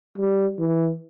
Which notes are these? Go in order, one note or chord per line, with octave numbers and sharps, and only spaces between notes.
G3
E3